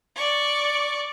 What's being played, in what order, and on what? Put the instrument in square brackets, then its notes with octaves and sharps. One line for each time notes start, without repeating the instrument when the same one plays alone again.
[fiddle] D5 C#6